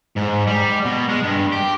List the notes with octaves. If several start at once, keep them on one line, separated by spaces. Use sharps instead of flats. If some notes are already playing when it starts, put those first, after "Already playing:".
G#2
G3
B2
G#3
G2
G4